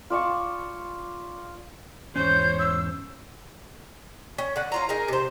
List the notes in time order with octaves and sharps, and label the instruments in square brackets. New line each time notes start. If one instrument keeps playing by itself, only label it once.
[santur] F4 D5 A5 C#6
[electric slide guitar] E2 G#2 C#4 [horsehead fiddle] C5 C#5 [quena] G6
[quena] E6
[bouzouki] C#4
D3 F#5
C#4 F4 A#5
D#4 G#4 A#4
C3 C5